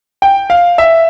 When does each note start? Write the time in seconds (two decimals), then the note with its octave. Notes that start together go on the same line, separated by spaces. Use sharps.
0.22 G5
0.50 F5
0.78 E5